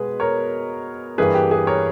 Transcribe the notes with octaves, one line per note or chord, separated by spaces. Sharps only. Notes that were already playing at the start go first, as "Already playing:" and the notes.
Already playing: B2 G#3 B3 G#4 B4
A#4 C#5
G2 E3 A#3 G#4 B4
G4
G#4
A#4 C#5